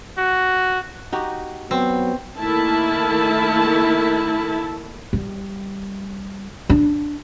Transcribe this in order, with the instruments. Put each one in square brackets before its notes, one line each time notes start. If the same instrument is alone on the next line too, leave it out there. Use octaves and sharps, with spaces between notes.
[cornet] F#4
[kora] D#4 F#4 G4
[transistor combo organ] F#3 [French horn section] B3 [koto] C4
[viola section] D#3 A3 A#3 E4 A5
[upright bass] G3
D4